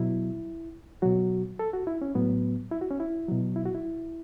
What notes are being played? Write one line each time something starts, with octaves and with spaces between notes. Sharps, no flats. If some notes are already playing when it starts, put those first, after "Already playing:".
Already playing: B2 F#3 E4
B2 F#3 F#4
A4
F#4
E4
C#4
A2 F#3 B3
E4
F#4
C#4
E4
B2 F#3
E4
F#4
E4